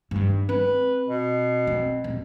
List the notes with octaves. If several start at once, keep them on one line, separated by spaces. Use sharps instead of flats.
G2 D#3
C4 B4
B2
C4
D#1